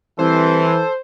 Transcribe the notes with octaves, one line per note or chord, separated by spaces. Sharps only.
C2 E3 A4 C5